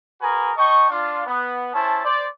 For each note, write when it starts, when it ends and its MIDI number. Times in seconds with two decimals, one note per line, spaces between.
0.21 0.51 66
0.21 0.51 68
0.21 0.51 70
0.21 0.51 71
0.21 0.51 80
0.21 0.51 82
0.57 0.88 75
0.57 0.88 79
0.57 0.88 81
0.57 0.88 85
0.90 1.25 62
0.90 1.25 65
1.27 1.69 59
1.74 2.03 61
1.74 2.03 64
1.74 2.03 72
1.74 2.03 81
2.05 2.25 72
2.05 2.25 74